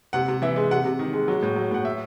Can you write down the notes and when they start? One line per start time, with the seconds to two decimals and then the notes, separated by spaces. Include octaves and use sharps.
0.13 C3 F#5
0.28 C3
0.42 E3 E5
0.56 G#3
0.71 C3 F#5
0.85 C3
0.99 D#3
1.13 G#3
1.28 F#3
1.42 A2
1.56 F#3
1.71 A2 F#5
1.85 E5